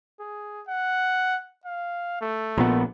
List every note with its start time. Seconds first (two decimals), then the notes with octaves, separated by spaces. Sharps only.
0.20 G#4
0.68 F#5
1.65 F5
2.21 A3
2.58 A#1 A#2 B3